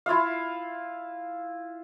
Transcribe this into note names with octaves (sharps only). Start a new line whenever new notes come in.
E4 F4 E5 F5